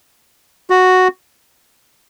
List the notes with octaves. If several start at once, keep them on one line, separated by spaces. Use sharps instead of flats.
F#4